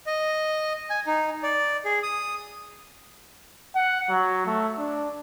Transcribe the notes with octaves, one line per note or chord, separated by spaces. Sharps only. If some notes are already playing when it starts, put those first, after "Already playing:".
D#5
G#5
D#4
D5
G#4
D#6
F#5
F#3
A3
D4